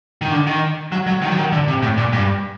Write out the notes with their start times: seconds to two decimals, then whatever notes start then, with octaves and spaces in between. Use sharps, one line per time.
0.22 D#3
0.31 D3
0.47 D#3
0.92 F#3
1.07 F#3
1.22 D#3
1.30 F#3
1.38 D#3
1.52 D3
1.68 C3
1.82 A2
1.98 A#2
2.13 G2